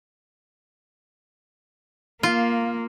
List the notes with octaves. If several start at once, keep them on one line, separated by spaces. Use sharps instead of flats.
A#3 F4